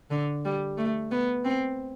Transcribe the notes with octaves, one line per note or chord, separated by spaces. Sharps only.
D3
G3
A3
B3
C4